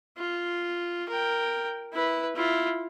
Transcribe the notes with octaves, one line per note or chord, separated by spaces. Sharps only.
F4
A#4 G5
E4 B4
E4 F4